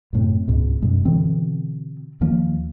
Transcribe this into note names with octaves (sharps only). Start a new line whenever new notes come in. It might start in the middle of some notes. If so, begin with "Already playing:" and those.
F#2 A2 C3
C#2 G#2 B2
F#2 B2 G#3
B2 D3 E3 C4
D#2 D#3 F3 A#3